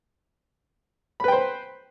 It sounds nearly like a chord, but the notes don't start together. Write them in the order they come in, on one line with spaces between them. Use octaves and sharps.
B5 B4 G5 C5